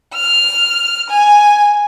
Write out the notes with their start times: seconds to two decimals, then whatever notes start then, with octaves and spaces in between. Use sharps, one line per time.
0.14 F6
1.10 G#5